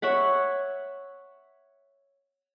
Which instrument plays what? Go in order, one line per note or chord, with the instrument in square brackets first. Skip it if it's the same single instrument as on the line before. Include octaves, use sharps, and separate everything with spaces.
[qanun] C#5 E5 F#5 B5